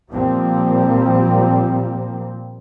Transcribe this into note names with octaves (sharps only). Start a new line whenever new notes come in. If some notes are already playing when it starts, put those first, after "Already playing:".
A#2 F3 G3 A#3 C4